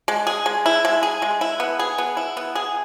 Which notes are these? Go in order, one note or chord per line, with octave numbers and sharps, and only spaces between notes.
G#3
G#4
G#3
E4
G#3
G#4
G#3
E4
B3
G#4
B3
E4
B3
G#4